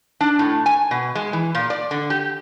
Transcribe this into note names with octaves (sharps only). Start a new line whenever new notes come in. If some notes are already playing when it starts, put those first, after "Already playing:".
D4
A2
G#5
B2
G#3
E3
A#2
D5
D3
G4